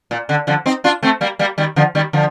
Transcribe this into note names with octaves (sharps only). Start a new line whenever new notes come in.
A#2
D3
D3 F3
C4 D#4
D4 F4
A3 C4
G3 A#3
G3 A#3
D#3 G3
D3 F3
D#3 G3
D3 F3